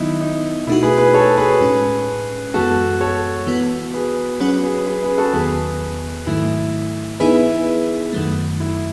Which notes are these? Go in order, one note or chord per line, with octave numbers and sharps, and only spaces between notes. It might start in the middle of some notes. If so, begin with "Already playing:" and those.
Already playing: D#3 F#3 B3 D#4 E4
D#4
B2 A3 D#4 E4 F#4
G#4 B4
G#4 B4
A4 C#5
G#4 B4
A2 G#3 C#4
F#2 E3 G#3 B3 F#4 A4
A4 C#5
E3 B3 F#4
G#4 B4
F#3 C#4 F#4 G#4 B4
G#4 B4
G#4 B4
G#4 B4
F#4 A4
E2 D#3 F#3 B3 G#4 B4
G#2 D#3 F#3 A3 E4
E3 B3 D#4 E4 G#4 B4
F#2 D#3 F#3 A3
E4